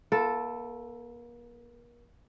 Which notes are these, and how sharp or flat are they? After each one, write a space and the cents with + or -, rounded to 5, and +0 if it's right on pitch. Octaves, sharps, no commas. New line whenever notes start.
A#3 +40 F4 -35 A4 +0